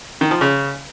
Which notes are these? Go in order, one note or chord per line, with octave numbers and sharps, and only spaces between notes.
D#3
F3
C#3